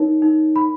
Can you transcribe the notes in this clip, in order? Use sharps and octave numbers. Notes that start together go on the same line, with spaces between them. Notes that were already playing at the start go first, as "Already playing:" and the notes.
Already playing: D#4 A#4 C#5
D#4
B5